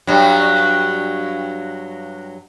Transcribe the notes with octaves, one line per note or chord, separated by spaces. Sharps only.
G2 F#3